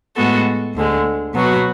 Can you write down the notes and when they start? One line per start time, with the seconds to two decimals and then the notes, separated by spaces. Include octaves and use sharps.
0.16 A2 G#3 B3 F#4 A4
0.75 D2 D3 G#3
1.34 B2 F#3 B3 F#4